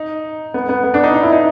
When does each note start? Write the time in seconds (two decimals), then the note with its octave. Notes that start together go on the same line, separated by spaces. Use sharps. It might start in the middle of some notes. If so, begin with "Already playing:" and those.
Already playing: D#4
0.54 B3
0.69 B3
0.84 B3
0.94 D4
1.04 D#4
1.14 D#4
1.23 E4
1.32 D#4